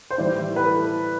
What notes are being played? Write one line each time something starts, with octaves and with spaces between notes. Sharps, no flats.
C5
A2 E3 G3 D5
B4
A4